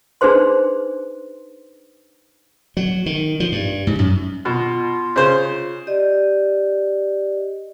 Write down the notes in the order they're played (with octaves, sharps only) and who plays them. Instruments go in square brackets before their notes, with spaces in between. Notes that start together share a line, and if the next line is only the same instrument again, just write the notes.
[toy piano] D4 D#4 G#4 B4 C5 C6
[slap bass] F#3
D#3
F3
G2
G#2
F#2
[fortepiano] B2 [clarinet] F4
[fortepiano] C#3 C5
[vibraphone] G4 D5 D#5